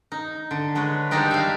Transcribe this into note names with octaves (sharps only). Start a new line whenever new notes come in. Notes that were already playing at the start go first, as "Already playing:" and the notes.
D#4
D3
D3 G#3 B4 C#5
G3 G#3 A#3 D4 D#4 G4
E5 F5